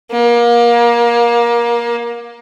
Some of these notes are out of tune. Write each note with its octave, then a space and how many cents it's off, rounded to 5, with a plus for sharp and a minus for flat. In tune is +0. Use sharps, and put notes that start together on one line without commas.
A#3 +25